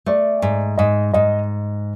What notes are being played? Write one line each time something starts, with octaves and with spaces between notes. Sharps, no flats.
A3 D5
G#2
G#2 D#5
G#2 D#5